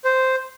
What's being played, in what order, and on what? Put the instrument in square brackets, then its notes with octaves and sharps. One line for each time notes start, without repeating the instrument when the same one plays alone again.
[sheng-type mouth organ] C5